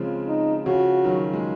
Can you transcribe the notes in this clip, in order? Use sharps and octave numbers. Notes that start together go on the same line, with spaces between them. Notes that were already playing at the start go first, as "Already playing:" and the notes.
Already playing: C#3 F3 G#3 C4
D#4
C#3 F3 F#4
D#3 F#3
G#3